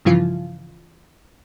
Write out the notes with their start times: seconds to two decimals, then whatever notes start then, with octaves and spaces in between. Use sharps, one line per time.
0.05 G2 C#3 E3 F3 F4